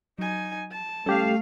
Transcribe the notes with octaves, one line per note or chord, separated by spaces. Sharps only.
F#3 D#4 G#5
A5
G3 A3 C#4 G4 A4 F5